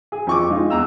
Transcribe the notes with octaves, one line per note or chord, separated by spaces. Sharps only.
G#4
F2 C#6 D6
G#3 D#4 F4
E2 A#5 E6